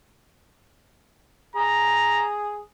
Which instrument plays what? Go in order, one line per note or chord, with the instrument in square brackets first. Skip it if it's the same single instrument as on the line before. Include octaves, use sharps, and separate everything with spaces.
[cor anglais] G#4 [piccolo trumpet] A#5